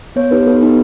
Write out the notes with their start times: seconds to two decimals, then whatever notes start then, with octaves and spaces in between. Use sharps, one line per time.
0.16 B3 C#5
0.31 D#4 G4 B4
0.46 B3 A4
0.62 D#4 G4 B4